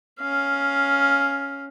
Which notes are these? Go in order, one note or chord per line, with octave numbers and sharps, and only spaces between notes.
C#4 F5